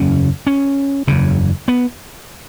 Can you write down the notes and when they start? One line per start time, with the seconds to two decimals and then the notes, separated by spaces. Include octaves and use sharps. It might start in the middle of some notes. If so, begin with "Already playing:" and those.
Already playing: F#1 E2 C#3 C#4
0.47 C#4
1.07 F#1 E2 C#3
1.68 B3